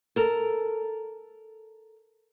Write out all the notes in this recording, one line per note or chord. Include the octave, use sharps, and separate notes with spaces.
A4 A#4